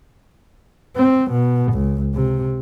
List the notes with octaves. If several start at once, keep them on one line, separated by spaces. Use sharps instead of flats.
C4
B2
C#2
C3